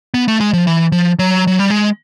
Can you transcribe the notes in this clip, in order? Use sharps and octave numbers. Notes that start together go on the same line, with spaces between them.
B3
A3
G#3
F3
E3
F3
F#3
F#3
G3
G#3